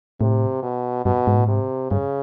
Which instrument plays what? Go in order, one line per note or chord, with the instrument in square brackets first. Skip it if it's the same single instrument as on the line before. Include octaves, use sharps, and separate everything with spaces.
[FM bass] A2 [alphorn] C3
[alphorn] B2
[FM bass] G2 [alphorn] B2
[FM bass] G#2
A2
[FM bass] G#2 [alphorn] C3
[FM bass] G2 [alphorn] C#3